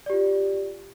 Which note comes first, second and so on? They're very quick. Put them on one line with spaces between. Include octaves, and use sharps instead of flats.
D5 G4 F4